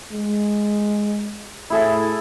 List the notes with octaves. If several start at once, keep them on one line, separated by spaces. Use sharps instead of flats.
G#3
A2 E4 G#4 A4